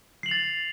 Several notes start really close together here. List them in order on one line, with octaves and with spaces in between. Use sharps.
C7 F#7 F7 A6